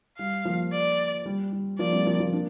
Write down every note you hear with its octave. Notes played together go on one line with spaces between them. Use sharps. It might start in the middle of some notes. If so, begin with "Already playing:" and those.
G3 F5
F3 A#3
D5
G3
G3
F3 A#3 D5
G3 C4
F3 A#3
F3 A#3
A#3 D4